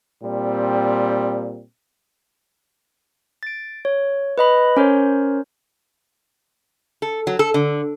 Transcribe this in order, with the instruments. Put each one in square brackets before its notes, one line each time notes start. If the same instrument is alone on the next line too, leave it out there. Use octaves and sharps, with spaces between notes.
[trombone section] A#2 G3 C4
[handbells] A6 D7
C#5
B4 D#5 B5
C#4 A#4 C5 C#5
[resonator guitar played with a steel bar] A4
F#3
A4
D3